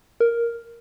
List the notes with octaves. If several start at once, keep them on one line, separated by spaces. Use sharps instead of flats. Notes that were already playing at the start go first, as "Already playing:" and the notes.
A#4